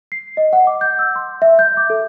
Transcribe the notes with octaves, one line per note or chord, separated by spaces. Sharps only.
C7
D#5
F#5
D6
G6
E6
C6
E5
G6
D6
A4